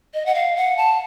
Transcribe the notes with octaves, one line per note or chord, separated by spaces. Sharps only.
D#5
F#5
F5
F#5
A5